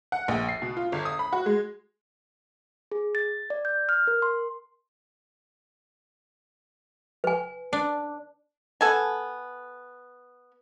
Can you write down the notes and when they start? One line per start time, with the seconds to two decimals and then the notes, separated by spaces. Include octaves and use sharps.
0.12 F#5
0.28 A#1
0.49 C7
0.62 B2
0.77 F4
0.92 G1
1.05 D#6
1.19 B5
1.33 F#4
1.46 G#3
2.92 G#4
3.15 A6
3.50 D5
3.65 G6
3.89 F6
4.07 A#4
4.22 C6
7.24 B4 G#5
7.73 D4
8.81 B3 A4 G#5